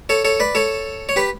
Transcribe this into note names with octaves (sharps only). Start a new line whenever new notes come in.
A4 C#5
A4 C#5
B4 D5
A4 C#5
C#5
G4 B4